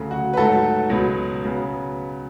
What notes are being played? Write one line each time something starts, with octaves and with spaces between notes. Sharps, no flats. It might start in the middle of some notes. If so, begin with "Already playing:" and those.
Already playing: D2 C#3 F#3 A3
F#4
B4
G#2 F#3 A3 F#4 A4
C#2 B2 F#3 B3
C#3 F#3 B3